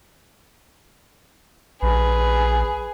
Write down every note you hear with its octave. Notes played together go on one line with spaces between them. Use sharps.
A#1 G#4 B4